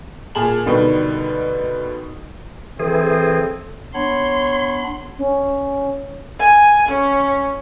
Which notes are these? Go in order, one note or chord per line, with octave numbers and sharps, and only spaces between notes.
A#2 G#4 A5 F#7
B2 D3 D#3 G3
E3 C4 G#4 A4
B3 D4 C#5 B5 C6
C#4
G#5
C#4